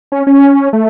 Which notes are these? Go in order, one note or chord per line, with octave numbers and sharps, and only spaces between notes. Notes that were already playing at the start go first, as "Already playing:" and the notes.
C#4
C#4
A3